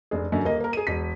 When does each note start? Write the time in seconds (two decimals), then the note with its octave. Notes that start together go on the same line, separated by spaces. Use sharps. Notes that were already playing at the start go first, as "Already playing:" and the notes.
0.11 F1 D4 G#4
0.32 F#2 D3
0.44 D#1 A#3 D#5
0.60 A#3 A#4
0.73 G#4 D#7
0.87 E1 B6